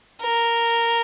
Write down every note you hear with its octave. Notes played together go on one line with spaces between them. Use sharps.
A#4